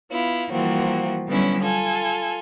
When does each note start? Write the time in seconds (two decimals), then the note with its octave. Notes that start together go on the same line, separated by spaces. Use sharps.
0.11 B3 E4 F4
0.50 E3 F3 G3 A#3 C4 F#4
1.27 D3 F#3 G3 B3 C#4 E4
1.62 F4 A4 G#5